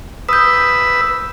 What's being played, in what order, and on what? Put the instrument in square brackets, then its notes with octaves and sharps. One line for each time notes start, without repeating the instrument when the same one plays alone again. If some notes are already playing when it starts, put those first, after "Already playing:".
[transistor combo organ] B4 E6 [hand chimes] D#6 G6